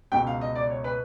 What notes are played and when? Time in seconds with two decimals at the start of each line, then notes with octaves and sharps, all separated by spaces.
0.12 C#2 B2 G5
0.27 F5
0.41 D#5
0.55 D5
0.70 C#5
0.84 B4